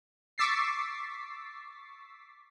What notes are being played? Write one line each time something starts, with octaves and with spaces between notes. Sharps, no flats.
C#6 D6 E6 A6 B6 C7